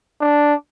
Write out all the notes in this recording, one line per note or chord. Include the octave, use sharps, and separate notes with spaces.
D4